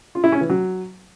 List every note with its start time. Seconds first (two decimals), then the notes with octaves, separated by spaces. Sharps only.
0.15 F4
0.24 E4
0.32 C#4
0.41 E3
0.50 F#3